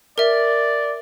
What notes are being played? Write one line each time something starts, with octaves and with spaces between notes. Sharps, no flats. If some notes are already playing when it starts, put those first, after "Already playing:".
A#4 D5 E5